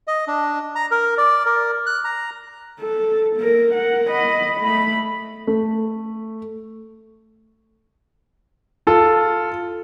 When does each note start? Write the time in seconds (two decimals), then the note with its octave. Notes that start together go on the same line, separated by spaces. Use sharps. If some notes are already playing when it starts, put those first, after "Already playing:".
0.07 D#5
0.28 D4
0.76 A#5
0.91 A#4
1.18 D5
1.46 A#4
1.86 F#6
2.04 A#5
2.81 A4
3.36 A#3 A#4
3.74 A#4 F#5
4.10 D#5 B5
4.61 A3 B5
5.47 A3
8.87 F4 A4